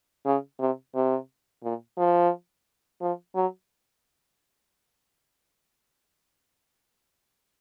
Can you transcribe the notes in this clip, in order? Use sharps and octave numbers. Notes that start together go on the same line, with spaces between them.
C#3
C3
C3
A#2
F3
F3
F#3